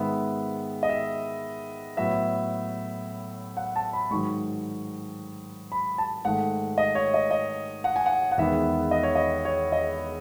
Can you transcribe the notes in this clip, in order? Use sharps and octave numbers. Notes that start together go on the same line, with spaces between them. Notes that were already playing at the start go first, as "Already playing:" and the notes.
Already playing: G#2 D#3 G#3 B3 E5
D#5
E5
A2 F#3 B3 E5
F#5
A5
B5
G#2 D#3 F#3 C#6
B5
A5
G#2 D#3 A3 F#5
D#5
C#5
D#5
D#5
F#5
G#5
F#5
F#5
E2 D#3 G#3 B3 E5
D#5
C#5
D#5
C#5
D#5